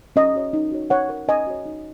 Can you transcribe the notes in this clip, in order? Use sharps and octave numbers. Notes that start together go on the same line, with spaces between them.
C#4 D#5
F#4 C#5
D#4
F#4 C#5
C#4 C#5 F#5
A#4 C#5
C#4 D#5 G#5
F#4 C#5
D#4